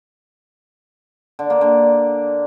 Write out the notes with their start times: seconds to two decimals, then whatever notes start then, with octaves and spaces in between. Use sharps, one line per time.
1.39 D3
1.50 A#3
1.61 D3